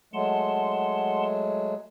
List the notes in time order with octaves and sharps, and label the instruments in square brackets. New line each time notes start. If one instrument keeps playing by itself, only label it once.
[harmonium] F#3 G#3 A3 [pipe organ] F#5 A5 C6